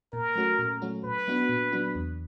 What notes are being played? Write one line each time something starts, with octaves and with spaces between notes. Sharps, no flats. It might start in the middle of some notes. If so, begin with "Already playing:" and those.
A#2 A#4
F#3 A3 C#4 F#4
A#2
F#3 A3 C#4 F#4
A#2 B4
F#3 B3 D4 F#4
A#2
F#3 B3 D4 F#4
E2